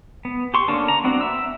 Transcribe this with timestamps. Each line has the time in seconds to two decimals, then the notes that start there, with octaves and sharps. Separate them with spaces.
0.25 B3
0.54 G4 C6 C#6
0.68 D3 A#3 C#4 D4
0.88 A#5
1.04 B3 C4 D4 F#4
1.21 E5 E6